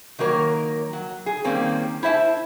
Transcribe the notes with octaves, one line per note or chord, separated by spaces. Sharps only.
D#3 F#3 A#3 A#4 C#5
F#3
G#4
D#3 G3 A#3 C4 C#4
E4 C5 E5 A5